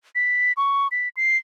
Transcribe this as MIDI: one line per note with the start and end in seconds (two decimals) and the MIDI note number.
0.15 0.53 95
0.57 0.88 85
0.92 1.09 95
1.17 1.37 96